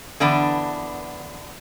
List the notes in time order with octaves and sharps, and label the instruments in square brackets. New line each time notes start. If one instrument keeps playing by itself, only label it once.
[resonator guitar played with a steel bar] D3 E3 B3 D4